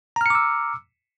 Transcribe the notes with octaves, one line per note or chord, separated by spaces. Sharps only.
A#5 D6 E6 F6 C#7